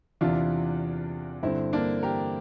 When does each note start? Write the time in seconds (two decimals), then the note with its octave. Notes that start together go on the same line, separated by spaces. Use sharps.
0.21 E2 C3 E3 D4 F4
1.43 G2 D3 C4 E4
1.73 A#3 D4
2.03 G4 A#4